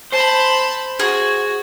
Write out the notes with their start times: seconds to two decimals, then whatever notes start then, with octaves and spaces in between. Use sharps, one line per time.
0.12 C5 A5 B5
0.99 F#4 G#4